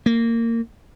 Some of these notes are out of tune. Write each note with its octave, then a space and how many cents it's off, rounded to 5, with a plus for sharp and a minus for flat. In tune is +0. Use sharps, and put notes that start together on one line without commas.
A#3 -20